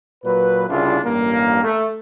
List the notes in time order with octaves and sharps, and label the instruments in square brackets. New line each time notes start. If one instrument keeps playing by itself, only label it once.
[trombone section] A#2 F#3 B4
C2 C#3 D4 E4 F4
A1 G2 A#3
A3